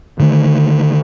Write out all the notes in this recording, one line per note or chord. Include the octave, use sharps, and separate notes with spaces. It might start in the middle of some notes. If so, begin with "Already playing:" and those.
D3 D#3 A3